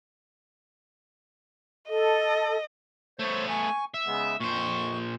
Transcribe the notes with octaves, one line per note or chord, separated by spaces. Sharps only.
A4 D#5
A3 B3 C5 C#5
G#5 C#6
E5
C#3 G#3 B3
F2 A#2 C5 C#6